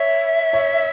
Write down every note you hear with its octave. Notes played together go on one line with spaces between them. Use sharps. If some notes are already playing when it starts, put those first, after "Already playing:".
Already playing: C#5 E5
C#5